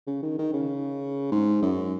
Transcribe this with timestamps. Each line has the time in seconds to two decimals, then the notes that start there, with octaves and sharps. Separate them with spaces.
0.07 C#3
0.22 D#3
0.38 D#3
0.54 C#3
1.31 G#2
1.62 F#2